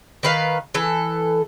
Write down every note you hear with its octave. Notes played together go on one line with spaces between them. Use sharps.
D#3 B4 F5
E3 A4